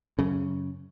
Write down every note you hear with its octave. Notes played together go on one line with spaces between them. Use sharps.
F#2 C#3